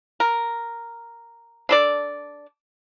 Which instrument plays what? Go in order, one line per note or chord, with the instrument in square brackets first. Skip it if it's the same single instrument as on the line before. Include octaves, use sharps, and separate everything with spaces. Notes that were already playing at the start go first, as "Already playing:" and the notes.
[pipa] A#4
D4 A4 D5